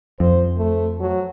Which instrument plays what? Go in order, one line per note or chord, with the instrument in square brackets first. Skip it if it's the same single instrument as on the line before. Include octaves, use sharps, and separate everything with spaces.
[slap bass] F2 [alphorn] C5
[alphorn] A3
F#3